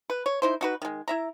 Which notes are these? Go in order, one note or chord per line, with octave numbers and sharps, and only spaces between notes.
B4
C#5
D#4 E4 C5
D#4 F#4 B4
D#3 G#3
E4 E5 A#5